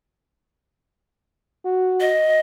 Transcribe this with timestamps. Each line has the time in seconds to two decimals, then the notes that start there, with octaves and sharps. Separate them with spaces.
1.65 F#4
2.00 D#5